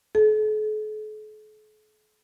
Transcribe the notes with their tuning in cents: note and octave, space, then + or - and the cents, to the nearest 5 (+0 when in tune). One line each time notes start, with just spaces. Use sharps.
A4 -45